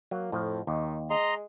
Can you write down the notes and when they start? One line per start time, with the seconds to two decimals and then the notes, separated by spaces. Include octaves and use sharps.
0.11 F#3 A#3
0.32 F2 A2 F3
0.67 D#2 D#3
1.10 G#3 D#5 A#5 C6